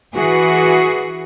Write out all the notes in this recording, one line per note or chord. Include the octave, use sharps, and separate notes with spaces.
E3 F#4 G#4